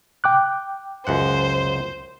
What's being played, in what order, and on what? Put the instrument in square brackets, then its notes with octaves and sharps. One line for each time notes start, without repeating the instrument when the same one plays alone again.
[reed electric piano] G5 D6 F#6
[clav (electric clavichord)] C#2 F#2 F#5 [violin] C5